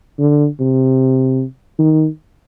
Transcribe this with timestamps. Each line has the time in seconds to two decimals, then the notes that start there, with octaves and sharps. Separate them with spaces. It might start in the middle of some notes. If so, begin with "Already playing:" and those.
0.19 D3
0.60 C3
1.79 D#3